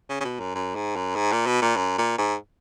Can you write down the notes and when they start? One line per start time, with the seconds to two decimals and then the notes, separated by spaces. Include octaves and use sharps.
0.09 C#3
0.21 C#3
0.24 B2
0.40 F#2
0.55 F#2
0.75 G#2
0.96 F#2
1.16 G#2
1.32 A#2
1.46 B2
1.62 A#2
1.77 F#2
1.98 A#2
2.18 G#2